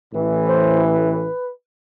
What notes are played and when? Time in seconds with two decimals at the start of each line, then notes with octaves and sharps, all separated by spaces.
0.11 A1 A2 E3
0.48 C5
0.85 B4